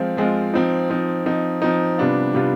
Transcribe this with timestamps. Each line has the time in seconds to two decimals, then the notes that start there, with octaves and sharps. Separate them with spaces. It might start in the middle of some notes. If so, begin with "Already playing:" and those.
Already playing: F3 G#3 C4 F4
0.17 F3 G#3 C4 F4
0.54 F3 C4 D#4
0.90 F3 C4 D#4
1.26 F3 C4 D#4
1.62 F3 C4 D#4
1.98 C3 G3 B3 D4 F4
2.35 C3 G3 B3 D4 F4